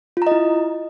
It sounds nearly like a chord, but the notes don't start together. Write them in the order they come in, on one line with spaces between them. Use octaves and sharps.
F4 A#5 D#5 E4